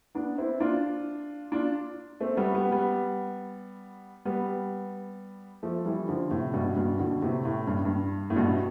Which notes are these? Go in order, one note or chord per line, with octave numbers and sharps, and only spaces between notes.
B3 D4
C4 E4
D4 F4
D4 F4
A3 C4
G3 B3
G3 B3
G3 B3
G3 B3
F3 A3
E3 G3
D3 F3
A2 C3
G2 B2
G2 B2
B2 D3
A2 C3
A2
G2
G2
A2
G2 B2